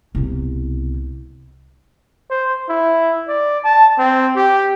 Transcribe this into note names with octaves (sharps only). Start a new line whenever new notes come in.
C2 B2
C5
E4
D5
A5
C4
G4